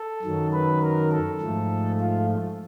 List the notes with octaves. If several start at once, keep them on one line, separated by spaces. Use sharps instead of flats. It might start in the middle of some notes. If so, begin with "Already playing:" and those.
Already playing: A4
F#2 D#3 F#3
B4
A#4
A4
G#2 F3 A3
F4